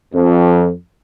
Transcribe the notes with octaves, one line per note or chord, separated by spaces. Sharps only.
F2